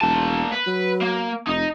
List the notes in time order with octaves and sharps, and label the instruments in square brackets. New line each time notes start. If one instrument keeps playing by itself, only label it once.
[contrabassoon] E1 [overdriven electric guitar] A#3 A5
[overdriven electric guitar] B4
[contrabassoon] F#3
[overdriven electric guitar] A#3
[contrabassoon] F1 [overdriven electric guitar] D#4